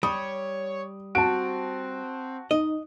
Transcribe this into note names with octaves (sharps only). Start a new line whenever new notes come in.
G3 C#5 D#6
C4 F#4 A5 D7
D#4 D#5